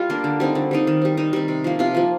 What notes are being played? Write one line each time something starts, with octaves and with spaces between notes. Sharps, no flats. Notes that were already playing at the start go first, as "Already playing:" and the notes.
Already playing: G3 F4
A#3 D4
D3
G3 C4 D#4
D3
G3 C4 D#4
D#3
G3 C4
D#3 D#4
G3 C4
C3
F3 A#3
C3 F4
F3 A#3